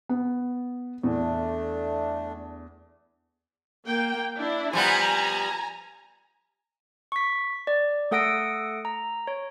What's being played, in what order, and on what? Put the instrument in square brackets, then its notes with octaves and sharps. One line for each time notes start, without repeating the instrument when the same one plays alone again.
[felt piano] B3
[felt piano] E2 [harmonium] A3 D4
[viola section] A#3 G5
D4 E4
[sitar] F3 G3 B3 [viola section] G#5 A#5
[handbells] C#6 B6
D5
A3 A4 F#5 D#6 A#6 D7
A#5
C#5